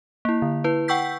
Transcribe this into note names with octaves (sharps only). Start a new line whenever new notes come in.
A#3 E4
D3
E4 B4
F#5 G5 C#6 E6 G6 B6